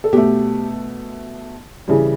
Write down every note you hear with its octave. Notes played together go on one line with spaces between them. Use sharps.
A4
B2 A3 G4
C#3 E3 G3